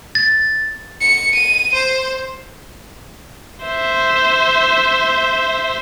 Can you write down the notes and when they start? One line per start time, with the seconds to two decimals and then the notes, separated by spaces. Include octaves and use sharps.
0.15 A6
1.01 C#7
1.35 D#7
1.74 C5
3.65 C5 E5